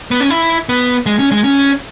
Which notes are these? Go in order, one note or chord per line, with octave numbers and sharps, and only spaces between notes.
B3
C#4
E4
B3
G#3
C#4
G#3
C#4